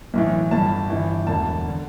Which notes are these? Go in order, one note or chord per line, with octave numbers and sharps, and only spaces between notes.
B1 A2 E3
G1 G2 D3 A5
G1 G2 E3
E1 D2 D3 A5
D3